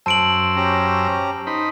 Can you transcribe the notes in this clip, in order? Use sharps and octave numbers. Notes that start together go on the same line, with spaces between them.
F#2 C5 A5 E6 D7 F#7
C#4 G4 A#5
D#4 C5 B5